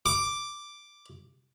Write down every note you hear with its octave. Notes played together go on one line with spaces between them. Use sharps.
D6